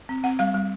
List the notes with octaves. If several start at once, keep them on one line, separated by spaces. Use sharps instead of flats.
C4
C4 F#5
G3 F5
G3